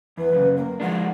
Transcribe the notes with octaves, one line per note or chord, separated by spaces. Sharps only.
E2 B4
F#2 C#3
A#3
F3 G#3 D4 F#5